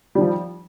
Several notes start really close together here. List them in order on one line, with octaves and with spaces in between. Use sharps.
G3 D#3 F3